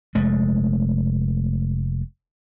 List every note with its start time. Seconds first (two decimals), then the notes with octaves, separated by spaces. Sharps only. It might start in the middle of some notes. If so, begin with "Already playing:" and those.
0.15 F1 G#3 A3